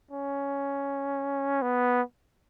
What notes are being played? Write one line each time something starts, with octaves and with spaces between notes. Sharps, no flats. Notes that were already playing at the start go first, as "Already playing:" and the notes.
C#4
B3